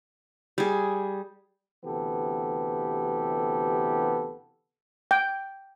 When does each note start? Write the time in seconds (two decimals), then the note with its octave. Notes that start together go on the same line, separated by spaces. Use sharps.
0.58 G3 G#4
1.85 D2 C3 E3 B3 G4 A4
5.11 G5